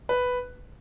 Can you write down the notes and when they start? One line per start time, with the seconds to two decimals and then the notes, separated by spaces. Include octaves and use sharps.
0.09 B4